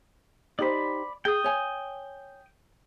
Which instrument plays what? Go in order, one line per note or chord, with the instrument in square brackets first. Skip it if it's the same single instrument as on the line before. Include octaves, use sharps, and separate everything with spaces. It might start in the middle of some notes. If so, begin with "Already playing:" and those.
[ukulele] D#4 G4 C5 [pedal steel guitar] D5 B5
[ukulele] G#4 [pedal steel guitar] G5 D#6
[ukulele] C#5 G#5